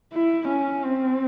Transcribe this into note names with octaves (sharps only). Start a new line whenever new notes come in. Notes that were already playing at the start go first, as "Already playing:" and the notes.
E4
C#4
C4